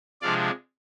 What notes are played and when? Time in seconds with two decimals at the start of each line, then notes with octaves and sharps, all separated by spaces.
0.22 C3 F3 G#3 D4 D5 F5